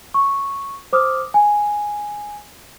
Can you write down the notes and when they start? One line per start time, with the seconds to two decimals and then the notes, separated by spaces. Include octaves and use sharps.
0.14 C#6
0.93 C5 D6 D#6 F6
1.34 G#5